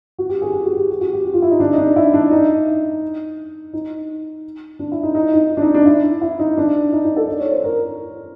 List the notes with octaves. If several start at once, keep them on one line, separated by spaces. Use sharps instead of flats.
F#4
G4
G#4
G4
F#4
G4
G4
F#4
G4
F#4
F4
E4
D#4
D4
D#4
D4
E4
D4
D#4
D#4
D4
E4
D#4
D#4
D#4
D4
D#4
D4
E4
E4
D#4
D4
D#4
D#4
A4
D5
C#5
C5
A#4